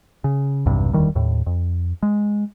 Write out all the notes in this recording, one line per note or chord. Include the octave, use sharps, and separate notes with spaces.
C#3
B1 E2 G2 C3
E1 D2 D#3 G3
D#2 A2
F2
G#3